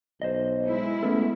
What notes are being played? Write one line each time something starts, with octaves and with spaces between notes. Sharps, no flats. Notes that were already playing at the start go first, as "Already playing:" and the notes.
B1 C5 D#5
G#3 E4
A3 B3 C#4 A4